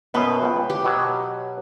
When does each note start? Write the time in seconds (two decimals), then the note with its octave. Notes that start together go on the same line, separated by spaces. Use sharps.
0.14 F#2 B2 B3 B4 C5
0.43 C#2 G5
0.70 G4 B4
0.84 B2 F#3